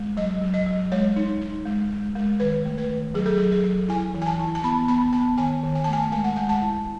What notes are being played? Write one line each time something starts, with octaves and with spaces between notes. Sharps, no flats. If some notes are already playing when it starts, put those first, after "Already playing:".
Already playing: G#3
F#3 D#5
F#3
D#5
F#3
G#3 C#5
D#4
D#4
G#3
G#3
G#3
D#3 B4
A3
B4
D#3
F#3 G#4
A4
F#3 G#4
A4
F#3
E4 G#5
E3
G#5
A5
E4
A5
B3 B5
B3 B5
B3 A5
D#3 G#5
D#3
G#5
A3 A5
G#5
G#3 G#5
F#5
G#3 G#5
A5
E4